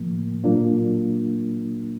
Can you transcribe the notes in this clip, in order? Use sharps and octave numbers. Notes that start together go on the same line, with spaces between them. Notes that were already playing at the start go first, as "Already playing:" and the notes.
Already playing: A2 F3 A#3
A#2 F#3 A#3 D4 F4